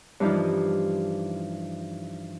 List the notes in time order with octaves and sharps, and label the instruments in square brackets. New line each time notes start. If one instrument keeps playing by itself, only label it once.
[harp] G2 E3 F3 D#4 F4